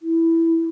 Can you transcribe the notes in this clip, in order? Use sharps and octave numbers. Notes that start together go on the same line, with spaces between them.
E4